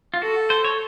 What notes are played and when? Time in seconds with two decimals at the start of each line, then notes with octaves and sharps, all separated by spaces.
0.14 F4
0.22 F#4 A4
0.50 C5
0.65 C#5